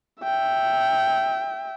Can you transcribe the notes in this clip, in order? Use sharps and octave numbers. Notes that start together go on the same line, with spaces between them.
E5 G5